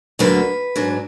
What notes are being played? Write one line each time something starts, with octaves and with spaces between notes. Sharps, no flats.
D2 D3 F#3 A#3 B4
G#2 F#3 D4